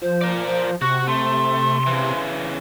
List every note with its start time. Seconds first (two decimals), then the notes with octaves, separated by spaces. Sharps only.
0.02 F3 C5
0.21 A#4 D5
0.47 C5
0.82 C3 F#4 F#5 C#6
1.07 A3 C6
1.87 C#3 E3